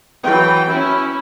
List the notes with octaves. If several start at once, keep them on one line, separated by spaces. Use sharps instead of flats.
E3 F#3 G5
C#4 E4